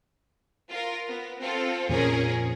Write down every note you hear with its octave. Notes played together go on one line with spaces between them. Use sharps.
F4 A#4
B3
C4 F4 A4
F2 A#2 F3 C#4 G#4 A#4